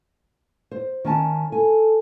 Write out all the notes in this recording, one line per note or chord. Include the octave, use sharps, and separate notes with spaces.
C5
D#3 C#4 A5
A4 G#5